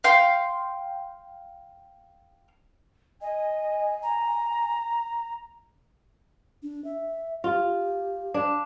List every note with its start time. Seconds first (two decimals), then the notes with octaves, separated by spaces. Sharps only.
0.04 F5 G5 C6
3.22 D#5 G#5
4.03 A#5
6.63 D4
6.84 E5
7.44 F4 G4
8.34 D4